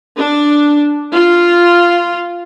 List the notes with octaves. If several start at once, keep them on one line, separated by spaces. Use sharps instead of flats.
D4
F4